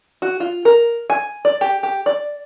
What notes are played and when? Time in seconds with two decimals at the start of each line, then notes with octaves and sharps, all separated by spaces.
0.22 F#4
0.40 F4
0.65 A#4
1.10 G#5
1.45 D5
1.61 G4
1.83 G4
2.06 D5